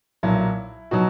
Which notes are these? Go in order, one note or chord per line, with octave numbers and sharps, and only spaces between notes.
B1 A#2 F#3 E4
B2 F#3 D#4 F#4